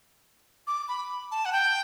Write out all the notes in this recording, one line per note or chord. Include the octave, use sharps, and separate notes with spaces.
D6
B5
A5
F#5
G5